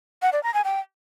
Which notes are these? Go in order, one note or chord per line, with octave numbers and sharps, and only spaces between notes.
F#5
D5
A#5
G#5
G5